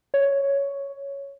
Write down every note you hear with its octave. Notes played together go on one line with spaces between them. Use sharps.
C#5